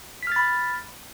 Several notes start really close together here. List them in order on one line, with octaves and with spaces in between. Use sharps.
B6 F6 A6 B5